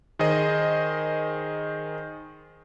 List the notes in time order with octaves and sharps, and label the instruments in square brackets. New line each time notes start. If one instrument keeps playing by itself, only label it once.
[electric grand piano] D#3 G#4 C5 D#5